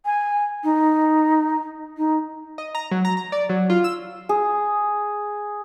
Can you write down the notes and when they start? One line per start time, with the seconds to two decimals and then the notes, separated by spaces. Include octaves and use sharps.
0.05 G#5
0.64 D#4
1.97 D#4
2.58 D#5
2.75 A#5
2.91 F#3
3.05 A#5
3.17 A#5
3.32 D5
3.49 F#3
3.70 F4
3.84 E6
4.29 G#4